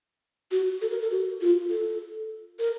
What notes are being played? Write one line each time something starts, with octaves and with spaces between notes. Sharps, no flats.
F#4
A4
A#4
A4
F#4
F4
A4
A#4